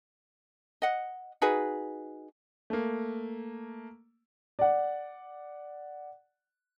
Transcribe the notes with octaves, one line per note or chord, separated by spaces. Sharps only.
D#5 F#5
D#4 F#4 G#4 B4
A3 A#3
D5 F#5